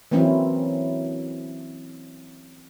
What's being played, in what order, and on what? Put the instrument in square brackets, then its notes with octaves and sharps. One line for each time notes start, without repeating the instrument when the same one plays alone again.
[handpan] E3 F#3 A#3 C4 C#4 E4